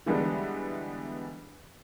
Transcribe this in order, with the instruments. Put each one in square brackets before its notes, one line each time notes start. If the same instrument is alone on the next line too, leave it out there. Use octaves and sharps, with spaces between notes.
[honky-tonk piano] D3 E3 G3 G#3 B3 D4